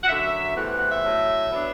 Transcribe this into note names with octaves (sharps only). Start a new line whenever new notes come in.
F#5
F#2 D3 F#3 E5
E2 C3 E3 A3 F#5
F#5
F#5
E5
A2 F#3 A3
F#3 B3 D4